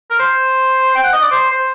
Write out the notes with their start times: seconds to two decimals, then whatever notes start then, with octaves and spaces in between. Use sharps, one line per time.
0.10 A#4
0.19 C5
0.95 G5
1.04 F#5
1.13 D#5
1.21 D5
1.31 C5
1.50 C5